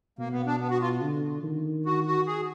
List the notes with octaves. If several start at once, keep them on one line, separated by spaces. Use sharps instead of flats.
B2 A#3
B3
D4
B3
F#4
F4
D3
D#3
F#4
F#4
G#4